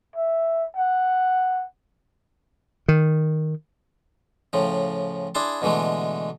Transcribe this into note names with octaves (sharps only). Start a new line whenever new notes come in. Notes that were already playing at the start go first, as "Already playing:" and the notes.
E5
F#5
D#3
A2 C#3 F3
D4 E4 G#4 G#5 A5 C6
B2 D3 E3 G#3 A3